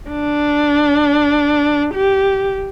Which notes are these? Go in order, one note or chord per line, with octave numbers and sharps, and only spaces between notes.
D4
G4